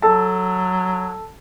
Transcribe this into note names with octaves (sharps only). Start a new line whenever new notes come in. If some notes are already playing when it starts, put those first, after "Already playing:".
F#3 A4 A5